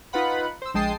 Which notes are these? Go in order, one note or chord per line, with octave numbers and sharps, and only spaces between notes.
D#4 F4 B4 F#5 B5
C5 E6
A#1 G#3 G5 A5 D#6 C7